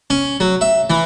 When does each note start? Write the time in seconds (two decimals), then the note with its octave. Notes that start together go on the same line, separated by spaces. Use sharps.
0.10 C#4
0.40 F#3
0.61 E5
0.90 E3